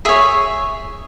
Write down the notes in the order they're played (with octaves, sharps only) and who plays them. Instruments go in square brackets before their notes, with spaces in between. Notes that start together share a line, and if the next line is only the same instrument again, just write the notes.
[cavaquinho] G#4 C#5 E5